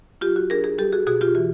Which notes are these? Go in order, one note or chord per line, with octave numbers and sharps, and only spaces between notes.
F#3 F4 G4
F#4
D4 G#4 A#4
G#4 A#4
G3 G4 A4
F#4 G#4
B2 F#4 G#4
F4 G4
E3 F#4